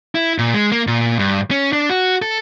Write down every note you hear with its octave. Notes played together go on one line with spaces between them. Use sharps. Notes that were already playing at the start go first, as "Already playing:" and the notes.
E4
A#2
G#3
A#3
A#2
G2
C#4
D4
F#4
A4